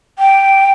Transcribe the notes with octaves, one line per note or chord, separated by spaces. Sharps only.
G5